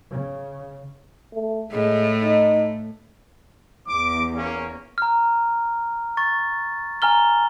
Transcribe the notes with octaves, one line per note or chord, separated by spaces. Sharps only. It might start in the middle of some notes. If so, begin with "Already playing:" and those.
C#3
A3
A2 G#3 A3
D#4
E2 D6
A#3 C#4
A#5 F6
C#6 A6
G#5 A#5 F6 G7